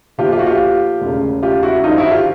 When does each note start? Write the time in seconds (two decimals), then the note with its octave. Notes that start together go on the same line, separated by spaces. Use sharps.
0.18 B1 A#2 F3 F4 G4
0.32 F4 G4
0.39 F#4
0.46 F4 G4
1.01 E1 D2 C#3
1.43 F4 G4
1.63 E4 F#4
1.83 G#1 G2 D3 F3 D#4 F4
1.98 E4 F#4
2.11 F4 G4